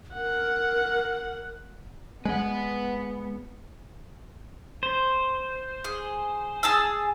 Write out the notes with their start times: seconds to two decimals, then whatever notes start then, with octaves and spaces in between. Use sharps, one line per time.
0.15 A#4 F#5
2.25 G#3 B3 B4 F#5
4.83 C5
5.84 G#4
6.63 G#4 A5 E6